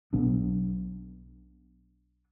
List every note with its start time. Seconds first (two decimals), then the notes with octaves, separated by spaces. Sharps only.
0.13 B1 F#3 B3 D4